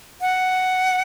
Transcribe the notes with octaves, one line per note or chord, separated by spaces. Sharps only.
F#5